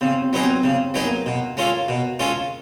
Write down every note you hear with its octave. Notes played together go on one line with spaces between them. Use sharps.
C#3 C4
C4
F#3 B3 D#4 G#4
C4
C#3 C4
F#3 B3 D#4 G#4
A#3
B2
G#3 C#4 F4 A4
B2
G#3 C#4 F4 A4